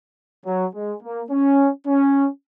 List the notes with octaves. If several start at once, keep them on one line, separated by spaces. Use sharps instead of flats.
F#3
G#3
A#3
C#4
C#4